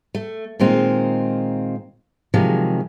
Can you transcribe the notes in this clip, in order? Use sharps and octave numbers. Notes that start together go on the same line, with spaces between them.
A3
A#2 D#3 G#3 C4 F4
C3 D#3 F3 F#3 G#3